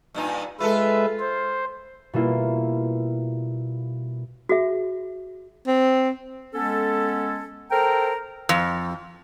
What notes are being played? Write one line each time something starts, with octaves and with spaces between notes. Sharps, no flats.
G2 A#2 D#4
G#3 F4 A4 B4 E5
C5
B2 G3 A#3 E4 F4
F#4 G#4 E5
C4
G#3 B3 C#4 A4
A4 A#4 C5 G5 A#5
F2